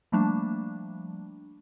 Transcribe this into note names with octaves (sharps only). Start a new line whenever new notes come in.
F3 G3 A3 A#3 D4